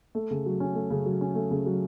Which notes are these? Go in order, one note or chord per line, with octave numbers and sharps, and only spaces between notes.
A3
C#3
F#3
C#4
A3
C#3
F#3
C#4
A3
C#3
F#3